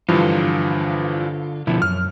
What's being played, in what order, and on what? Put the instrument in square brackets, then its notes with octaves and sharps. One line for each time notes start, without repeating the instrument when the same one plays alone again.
[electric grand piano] G2 E3 F3 [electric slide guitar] D3 F4
[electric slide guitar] B2 D3 F3 [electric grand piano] E4
[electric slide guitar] F#2 [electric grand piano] F6